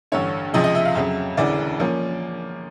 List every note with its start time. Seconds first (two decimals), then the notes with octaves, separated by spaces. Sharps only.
0.12 A1 G2 D3 C#5
0.53 C#2 C3 F3 G#3 D#5
0.64 D#5
0.75 E5
0.85 F5
0.95 F2 C#3 F#3 E5
1.37 E1 D2 C#3 E3 D5
1.80 F3 A#3 C#4